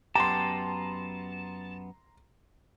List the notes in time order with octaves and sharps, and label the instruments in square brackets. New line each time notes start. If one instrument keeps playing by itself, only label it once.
[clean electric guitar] F#2 B3 G4 [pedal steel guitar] A5 [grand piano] A#5 C6